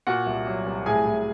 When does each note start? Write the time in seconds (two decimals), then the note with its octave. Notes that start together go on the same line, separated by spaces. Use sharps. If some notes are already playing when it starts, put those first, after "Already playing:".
0.07 A#2 F#4 F#5
0.26 C2
0.47 F#3
0.66 C2
0.86 A2 G#4 G#5
1.06 A2